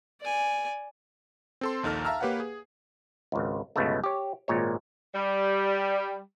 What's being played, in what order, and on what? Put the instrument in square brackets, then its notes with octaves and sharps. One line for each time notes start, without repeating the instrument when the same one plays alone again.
[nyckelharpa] D5 G#5
[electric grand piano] C4 A4 C6
A#1 D#2 D#4 A4 F6
E5 F5 A5 A#5 E6 F6
A#3 G4 B4 C#5 F5 F#5
G#4
[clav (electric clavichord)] G#1 C#2
G1 C#2 B2 G#3 A3
G4 C#5
G#1 A#2 G#3 C#5
[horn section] G3